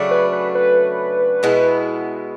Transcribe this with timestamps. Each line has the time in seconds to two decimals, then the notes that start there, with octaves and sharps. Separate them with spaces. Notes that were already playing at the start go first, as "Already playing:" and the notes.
Already playing: C#3 F#3 A3 D4
0.11 B4
0.33 B4
0.55 B4
1.43 B2 G#3 B3 E4